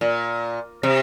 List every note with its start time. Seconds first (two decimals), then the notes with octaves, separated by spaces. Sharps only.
0.01 A#2
0.83 C3